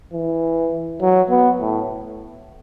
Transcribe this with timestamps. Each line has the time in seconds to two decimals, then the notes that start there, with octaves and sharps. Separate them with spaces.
0.13 E3
1.01 F#3
1.30 B3
1.60 A2